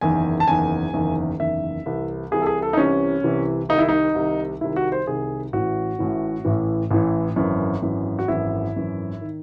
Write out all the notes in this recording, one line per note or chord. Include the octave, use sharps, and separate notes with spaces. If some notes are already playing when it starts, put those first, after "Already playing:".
F#1 E2 D#3 G#5
A5
F#1 E2 D#3 G#5
F#1 E2 D#3
F#1 E2 D#3 E5
C2 C3 E3
C2 C3 E3 G#4
A4
G#4
A4
D#4
C2 C3 E3 C#4
C2 C3 E3
C2 C3 D#3 D#4
E4
D#4
C2 C3 D#3
C2 C3 D#3 E4
F#4
C5
C2 C3 D#3 G#4
A1 A2 E3 F#4
A1 A2 E3
A1 A2 E3
A1 A2 E3
G#1 F#2 E3
G#1 F#2 E3
F#4
G#1 F#2 E3 E4
G#1 F#2 E3
D#3